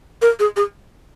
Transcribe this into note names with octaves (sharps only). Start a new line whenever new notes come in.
A#4
G#4
G#4